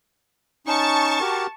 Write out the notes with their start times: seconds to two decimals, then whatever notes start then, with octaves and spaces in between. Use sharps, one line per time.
0.66 C#4 D#4 A5 C#6 A6
1.20 F#4 G4 A#4